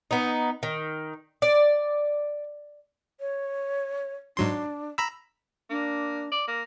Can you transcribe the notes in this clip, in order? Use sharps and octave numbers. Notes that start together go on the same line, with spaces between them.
B3 D#4
D#3
D5
C#5
G#2 F#3 D4 C6
A#5 B5 E6
A#3 D4
D5
A#3